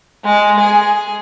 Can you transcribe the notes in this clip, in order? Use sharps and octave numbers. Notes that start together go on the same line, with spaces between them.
G#3
G#4